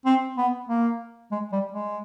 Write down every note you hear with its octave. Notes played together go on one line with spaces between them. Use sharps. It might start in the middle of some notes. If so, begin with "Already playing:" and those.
C4
B3
A#3
G#3
G3
G#3